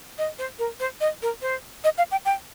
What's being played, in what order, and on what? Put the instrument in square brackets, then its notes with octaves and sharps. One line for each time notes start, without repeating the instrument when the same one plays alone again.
[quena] D#5
C5
A#4
C5
D#5
A#4
C5
D#5
F5
G5
G5